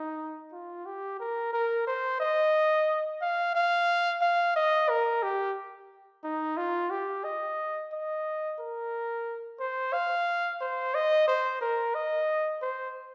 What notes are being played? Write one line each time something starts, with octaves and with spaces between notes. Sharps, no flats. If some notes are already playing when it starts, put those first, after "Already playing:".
Already playing: D#4
F4
G4
A#4
A#4
C5
D#5
F5
F5
F5
D#5
A#4
G4
D#4
F4
G4
D#5
D#5
A#4
C5
F5
C5
D#5
C5
A#4
D#5
C5